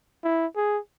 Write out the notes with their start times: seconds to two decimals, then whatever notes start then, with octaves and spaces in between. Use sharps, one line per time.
0.24 E4
0.56 G#4